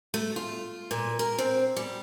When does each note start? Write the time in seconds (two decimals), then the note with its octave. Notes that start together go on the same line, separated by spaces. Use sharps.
0.14 A3
0.36 F4
0.91 A#2
1.19 A#4
1.39 C4
1.76 G3